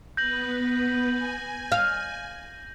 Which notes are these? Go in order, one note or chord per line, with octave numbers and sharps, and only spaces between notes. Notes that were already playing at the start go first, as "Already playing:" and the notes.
B3 B4 G6 A#6 F#7
G#5
F5